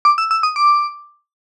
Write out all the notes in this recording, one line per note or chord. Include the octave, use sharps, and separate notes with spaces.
D6
E6
E6
D#6
D6